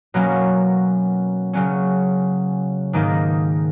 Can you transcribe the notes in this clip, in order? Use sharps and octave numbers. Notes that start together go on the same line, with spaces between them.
B2 F#3 A#3 C#4
C#3 F#3 C#4
G#2 D#3 A#3 D#4